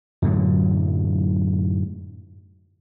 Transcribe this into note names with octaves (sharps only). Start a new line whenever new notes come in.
F#2 A2 D3 F#3